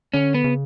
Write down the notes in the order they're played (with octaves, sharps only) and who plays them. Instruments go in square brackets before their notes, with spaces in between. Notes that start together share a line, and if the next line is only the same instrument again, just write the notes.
[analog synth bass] D3 [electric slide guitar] C#4
[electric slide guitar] B3
[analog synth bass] C#3